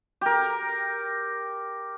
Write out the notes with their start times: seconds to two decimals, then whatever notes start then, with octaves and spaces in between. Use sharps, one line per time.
0.21 G4 A#4